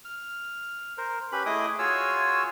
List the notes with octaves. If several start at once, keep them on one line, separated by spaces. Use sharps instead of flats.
F6
A#4 C5
C#4 G4 B4 B5
A3 E4 G#4 D#5 D6 D#6
F4 F#4 G#4 C#5 G#5 E6